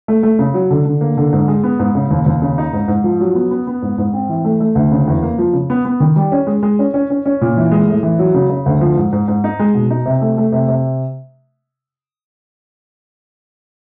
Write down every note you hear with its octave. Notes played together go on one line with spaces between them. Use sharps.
A3
A3
C#3
F#3
D3
D3
A#3
D3
G#2
G#3
B3
G#2
C#3
D#2
D#2
C#3
D#4
G#2
G#2
F3
F#3
B3
B3
B3
G#2
G#2
C4
E3
A3
A3
D2
C#3
E2
A#3
F3
C#3
B3
B3
D#3
G3
C#4
G#3
G#3
C#4
C#4
C#4
C#4
A#2
E3
G#3
A2
E3
F#3
C#3
C#3
D2
F3
G#2
G#2
G#2
D#4
G#3
B2
D#4
C3
A3
A3
C3
C3